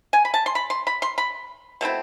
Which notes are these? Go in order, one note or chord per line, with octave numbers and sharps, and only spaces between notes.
G#5
B5
A5
C6
B5
C6
B5
C6
B5
B2 A3 C4 E4